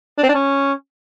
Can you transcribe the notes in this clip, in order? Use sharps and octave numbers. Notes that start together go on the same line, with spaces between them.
D4
C4
D4
C#4